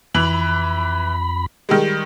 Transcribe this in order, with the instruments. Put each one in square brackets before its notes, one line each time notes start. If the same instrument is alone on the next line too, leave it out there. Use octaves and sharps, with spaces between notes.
[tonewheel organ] F2 B5 [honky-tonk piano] E3
[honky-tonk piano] D#3 G3 G#3